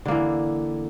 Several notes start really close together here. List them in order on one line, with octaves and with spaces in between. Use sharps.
D3 A#3 E3